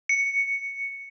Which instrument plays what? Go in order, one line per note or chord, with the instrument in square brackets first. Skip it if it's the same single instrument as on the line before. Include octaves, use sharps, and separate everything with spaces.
[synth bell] C#7